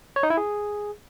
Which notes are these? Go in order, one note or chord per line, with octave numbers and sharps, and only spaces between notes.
C#5
D#4
E4
G#4